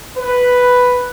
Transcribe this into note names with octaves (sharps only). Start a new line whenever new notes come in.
B4